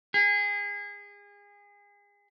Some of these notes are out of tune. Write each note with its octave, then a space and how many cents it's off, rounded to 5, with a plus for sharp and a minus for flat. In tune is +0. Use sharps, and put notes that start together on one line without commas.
G#4 -30